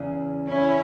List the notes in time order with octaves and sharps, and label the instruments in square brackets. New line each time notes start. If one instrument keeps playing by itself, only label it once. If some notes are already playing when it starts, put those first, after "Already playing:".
Already playing: [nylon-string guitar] E2 C#3 E3
[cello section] C#4 E4